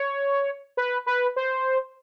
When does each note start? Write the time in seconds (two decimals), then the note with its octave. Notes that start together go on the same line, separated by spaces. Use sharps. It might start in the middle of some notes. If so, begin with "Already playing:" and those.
Already playing: C#5
0.77 B4
1.06 B4
1.36 C5